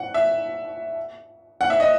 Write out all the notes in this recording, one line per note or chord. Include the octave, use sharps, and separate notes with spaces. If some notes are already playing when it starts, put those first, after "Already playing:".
Already playing: F#5
E5
F#5
E5
D#5